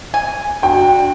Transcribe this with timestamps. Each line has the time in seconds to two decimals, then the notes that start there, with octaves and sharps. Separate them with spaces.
0.14 G#5
0.63 D4 F#4 G5